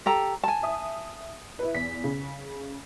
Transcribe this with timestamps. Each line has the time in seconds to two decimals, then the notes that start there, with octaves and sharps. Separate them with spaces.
0.06 G4 A4 A#5
0.44 G#5 A5
0.63 E5 D#6
1.59 E4 B4
1.74 E2 B6
2.04 C#3